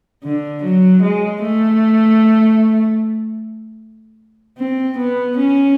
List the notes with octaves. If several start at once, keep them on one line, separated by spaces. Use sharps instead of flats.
D3
F#3
G#3
A3
C4
B3
C#4